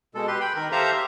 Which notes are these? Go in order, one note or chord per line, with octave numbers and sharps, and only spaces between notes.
B2 G#3 A4
G4 B4 C6
G5 B5
D#3 A#4
G4 A4 C5 E5 F5 A#5
G4